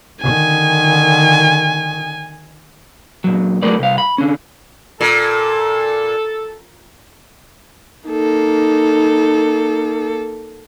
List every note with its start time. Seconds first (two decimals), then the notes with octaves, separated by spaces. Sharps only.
0.23 D3 D#3 G#5
3.24 A#2 F#3
3.63 F#3 G#3 A3 A#4 B4 D5
3.79 C2 F5
3.98 B5
4.18 D3 C#4
5.01 A#2 A4
8.09 A#3 D#4 A4